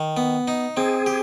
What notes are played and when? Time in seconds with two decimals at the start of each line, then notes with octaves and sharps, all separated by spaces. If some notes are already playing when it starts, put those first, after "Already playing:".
Already playing: D#3
0.17 B3
0.48 D#4
0.77 C4 G#4
1.06 G4